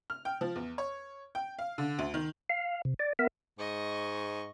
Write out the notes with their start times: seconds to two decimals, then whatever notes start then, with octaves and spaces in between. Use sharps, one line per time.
0.10 F6
0.25 G5
0.41 F3
0.56 E2
0.78 C#5
1.35 G5
1.59 F5
1.78 D3
1.99 D2
2.14 D#3
2.50 F5
2.85 C3
2.99 D5
3.19 B3 A#4 E5
3.59 G#2 D#5 C#6